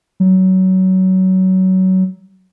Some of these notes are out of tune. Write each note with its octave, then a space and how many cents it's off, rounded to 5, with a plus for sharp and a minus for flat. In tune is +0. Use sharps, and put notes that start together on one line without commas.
F#3 +20